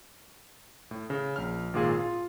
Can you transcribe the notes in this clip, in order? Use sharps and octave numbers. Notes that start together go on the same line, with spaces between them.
A2
C#3
A#1 F6
G#1 A#2 F4 G#4
F4